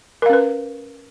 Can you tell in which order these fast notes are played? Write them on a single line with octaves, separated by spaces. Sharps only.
A#4 F5 C#4 B4